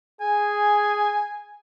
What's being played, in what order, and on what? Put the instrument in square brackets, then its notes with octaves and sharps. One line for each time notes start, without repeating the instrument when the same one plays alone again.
[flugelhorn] G#4 [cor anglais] G#5